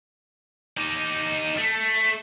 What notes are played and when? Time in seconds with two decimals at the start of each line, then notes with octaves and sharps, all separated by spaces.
0.77 D#4 G4
1.57 A3